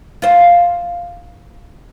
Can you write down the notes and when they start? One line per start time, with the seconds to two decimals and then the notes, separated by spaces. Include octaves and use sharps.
0.22 F4 C5